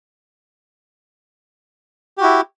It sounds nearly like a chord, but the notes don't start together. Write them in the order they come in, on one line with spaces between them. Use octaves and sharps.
G4 F#4 E4